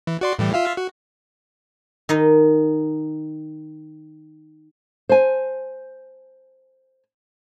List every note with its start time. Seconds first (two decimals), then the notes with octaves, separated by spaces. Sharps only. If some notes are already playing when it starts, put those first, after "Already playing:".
0.07 E3
0.21 F#4 D5 C6
0.39 A2 E3 G3
0.54 F4 E5 F5
0.77 F#4
2.09 D#3 D#4 D#5
5.09 C5 G#5